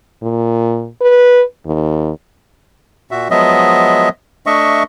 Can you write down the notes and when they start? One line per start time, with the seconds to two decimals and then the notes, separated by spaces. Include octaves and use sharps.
0.22 A#2
1.01 B4
1.66 D#2
3.11 A#2 F#4 E5
3.31 F3 F#3 G#3 B3 D#5 E5
4.46 A3 D4 D#5 E5 C#6